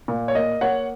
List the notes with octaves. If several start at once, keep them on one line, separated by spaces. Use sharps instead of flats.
A#2
C#5
A#3 D#5
A#3 C#5 F#5